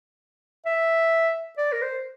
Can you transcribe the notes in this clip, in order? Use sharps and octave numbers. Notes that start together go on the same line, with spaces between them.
E5
D5
A#4
C5